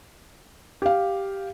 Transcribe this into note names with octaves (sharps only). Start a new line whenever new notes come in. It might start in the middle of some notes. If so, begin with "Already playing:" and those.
G4 F5